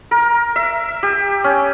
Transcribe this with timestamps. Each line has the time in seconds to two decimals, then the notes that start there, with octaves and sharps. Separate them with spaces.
0.11 A#4
0.56 E5
1.03 G4
1.44 C#4